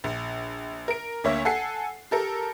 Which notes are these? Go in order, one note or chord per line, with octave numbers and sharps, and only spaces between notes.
A#1
A#4 D7
D2 A#3 C#5 E5
A4 F#5 G#5 C7
G4 A4 A#4